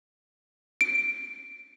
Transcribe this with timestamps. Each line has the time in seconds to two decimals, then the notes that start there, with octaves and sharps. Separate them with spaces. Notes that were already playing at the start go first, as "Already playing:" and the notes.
0.81 D7